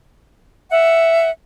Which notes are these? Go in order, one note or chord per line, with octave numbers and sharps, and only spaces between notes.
E5 F#5